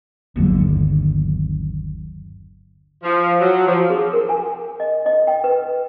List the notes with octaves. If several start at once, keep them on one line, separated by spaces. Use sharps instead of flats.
G1 D#2 D3 F#3
F3
F#3
F3
G#4
A#4
G#5
D#5
D#5
G5
B4